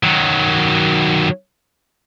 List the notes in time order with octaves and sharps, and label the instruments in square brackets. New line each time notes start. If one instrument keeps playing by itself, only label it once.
[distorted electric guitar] D#3 F#3